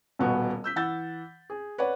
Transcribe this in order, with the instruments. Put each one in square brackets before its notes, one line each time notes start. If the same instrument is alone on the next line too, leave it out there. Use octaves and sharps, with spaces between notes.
[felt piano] D#1 B2 B3 F#4
E6 G6 B6
E3 F#5 E6 G6 A6
G#4
B4 C#5 D5 F#5